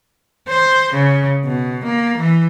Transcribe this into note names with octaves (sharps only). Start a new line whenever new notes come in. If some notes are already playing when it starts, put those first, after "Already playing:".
C5
C#3
B2
A#3
E3